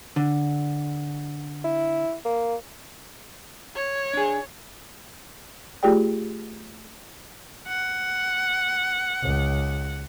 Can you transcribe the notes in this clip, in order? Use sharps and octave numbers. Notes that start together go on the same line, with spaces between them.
D3
E4
A#3
C#5
D4 G#4
A3 F4 G4 G#4 D5 G5
F#5
C#2